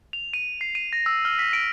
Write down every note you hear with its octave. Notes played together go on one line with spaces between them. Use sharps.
F7
D#7
C7
D#7
A#6
E6
F6
B6
D7